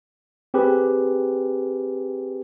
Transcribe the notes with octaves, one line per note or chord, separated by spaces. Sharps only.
C4 G4 G#4 B4